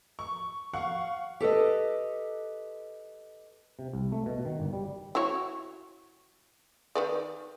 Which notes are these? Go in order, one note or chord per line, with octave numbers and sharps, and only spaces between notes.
C#6
F5 F#5 C#6
G4 A4 B4 D#5
C3
C2
A3
B2
D#3
G1
G3
E4 F#4 C#5
D#3 B4 D5